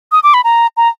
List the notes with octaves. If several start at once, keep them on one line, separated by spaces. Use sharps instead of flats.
D#6
D6
B5
A#5
A#5